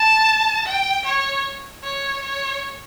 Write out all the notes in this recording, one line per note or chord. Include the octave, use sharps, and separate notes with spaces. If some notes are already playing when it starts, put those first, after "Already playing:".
Already playing: A5
G5
C#5
C#5
C#5